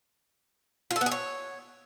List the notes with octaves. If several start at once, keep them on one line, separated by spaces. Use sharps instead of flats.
F4
A4
B3
G#4
C#5